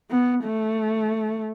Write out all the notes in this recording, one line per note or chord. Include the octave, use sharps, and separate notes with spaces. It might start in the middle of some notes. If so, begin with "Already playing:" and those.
B3
A3